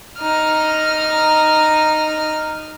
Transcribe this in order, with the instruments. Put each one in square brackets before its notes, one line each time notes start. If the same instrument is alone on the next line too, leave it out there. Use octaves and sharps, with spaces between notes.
[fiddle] D#4 F6